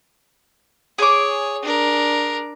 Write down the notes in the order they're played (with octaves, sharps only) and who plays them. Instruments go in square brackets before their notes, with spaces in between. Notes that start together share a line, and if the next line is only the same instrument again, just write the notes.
[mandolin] G#4 D6 [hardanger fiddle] C#5
[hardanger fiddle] D4 A#4